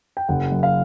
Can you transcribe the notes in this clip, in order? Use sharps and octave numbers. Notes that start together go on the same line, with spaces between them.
G5
F#1 F#5
F#2
F5